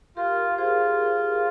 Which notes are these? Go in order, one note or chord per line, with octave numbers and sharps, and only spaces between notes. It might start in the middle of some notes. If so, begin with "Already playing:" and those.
F4 G4 A#4
F4 G#4 C5